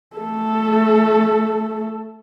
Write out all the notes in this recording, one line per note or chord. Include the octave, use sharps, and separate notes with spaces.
A3 A4